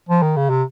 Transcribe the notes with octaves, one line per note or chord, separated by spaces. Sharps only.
F3
D#3
C#3
C3